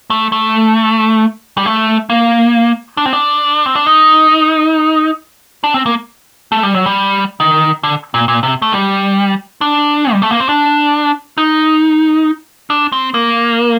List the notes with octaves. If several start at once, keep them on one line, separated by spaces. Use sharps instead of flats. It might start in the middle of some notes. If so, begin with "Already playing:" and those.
A3
A3
G3
A3
A#3
D4
C4
D4
C4
D4
D#4
D4
C4
A#3
A3
G3
F#3
G3
D#3
D3
A#2
A#2
C3
A3
G3
D4
G3
A3
A#3
C4
D4
D#4
D4
C4
A#3